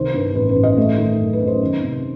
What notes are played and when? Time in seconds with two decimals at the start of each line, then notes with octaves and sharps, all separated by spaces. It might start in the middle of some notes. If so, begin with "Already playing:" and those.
Already playing: C2 D#3 C5
0.14 G2
0.35 A1 B4
0.49 B4
0.56 A1
0.63 D#5
0.77 A3
0.98 D#3
1.19 F#2
1.33 B4
1.40 F#2
1.47 C5
1.62 D#3
1.82 C3